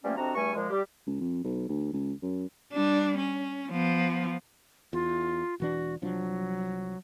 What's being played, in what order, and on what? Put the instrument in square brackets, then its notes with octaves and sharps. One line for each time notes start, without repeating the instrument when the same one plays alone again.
[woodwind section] F3 G3 A3 A#3 C#4
F2 C3 C4 D4 F#4 A#5
E2 G2 G3 A3 G#5 C#6
A#2 F3 G#3
G3 G4
[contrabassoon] C#2
F2
B1
D2
C#2
F#2
[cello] G3 D4
C#4
F3 B3
[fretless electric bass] E2 [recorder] F4
[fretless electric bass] E1 E3 D4 [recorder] F#4
[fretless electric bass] C2 F3 D4 [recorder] F#3